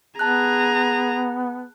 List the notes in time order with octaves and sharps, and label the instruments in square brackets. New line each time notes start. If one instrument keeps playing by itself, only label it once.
[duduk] B3 [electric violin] G#4 A#5 [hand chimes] A5 F#6